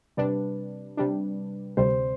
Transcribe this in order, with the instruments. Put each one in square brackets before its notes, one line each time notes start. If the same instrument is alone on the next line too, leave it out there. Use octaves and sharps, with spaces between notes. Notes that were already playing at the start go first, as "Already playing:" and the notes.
[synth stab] C3 G3 D4 [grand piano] B4
[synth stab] C3 G3 D4
[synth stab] D2 C3 G3 [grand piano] C5